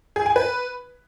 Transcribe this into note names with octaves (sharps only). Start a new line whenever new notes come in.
G#4
G#5
B4